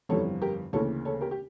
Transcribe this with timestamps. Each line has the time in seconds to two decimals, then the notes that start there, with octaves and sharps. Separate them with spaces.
0.09 G1 F2 E3 G3 A4 C#5
0.42 G4 A#4
0.73 D2 C#3 E3 A#3 A4 C#5
1.05 A4 C#5
1.21 G4 A#4
1.31 G4